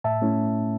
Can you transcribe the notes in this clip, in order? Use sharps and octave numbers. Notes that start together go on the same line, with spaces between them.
A2 E5 A5
A3 C#4 E4